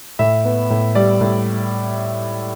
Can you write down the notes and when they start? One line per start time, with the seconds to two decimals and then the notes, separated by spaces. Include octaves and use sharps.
0.19 A2 E5
0.45 B3
0.70 A2
0.95 G3 D5
1.21 A2